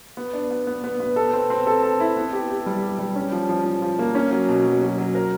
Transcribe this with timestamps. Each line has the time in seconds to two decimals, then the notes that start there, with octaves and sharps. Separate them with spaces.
0.17 B3
0.33 D4
0.51 B3
0.67 B3
0.84 B3
1.00 B3
1.16 A4
1.33 C4
1.50 C4
1.67 A4
1.83 A4
2.00 E4
2.17 B3
2.33 G4
2.50 G4
2.66 G3
2.83 G4
2.99 G3
3.16 C#4
3.32 F3
3.49 F3
3.65 F3
3.82 F3
3.99 A#3
4.15 C#4
4.31 F#3
4.49 B2
4.65 F#3
4.82 F#3
4.98 F#3
5.15 A#4